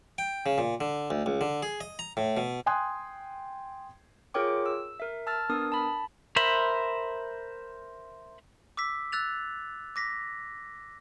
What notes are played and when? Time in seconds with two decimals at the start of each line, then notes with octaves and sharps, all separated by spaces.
0.18 G5
0.46 C#3
0.58 A#2
0.81 D3
1.10 D2
1.26 C#2
1.41 D3
1.62 G#4
1.81 D#5
1.99 A#5
2.17 A2
2.37 B2
2.66 G5 G#5 C6 D#6 F#6 G#6
4.34 F4 G#4 A#4 C#5 G5 D6
4.66 E6
5.00 A#4 E5
5.27 A5 E6 F6 A6
5.49 B3 D4 A#4 D#6
5.72 A5 B5
6.36 A#4 C5 E5 B5
8.77 D6 E6 B6
9.12 E6 F#6 A6 F7
9.96 D6 A#6 B6